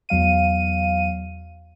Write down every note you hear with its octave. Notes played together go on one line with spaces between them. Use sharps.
E2 F#3 F5 D#7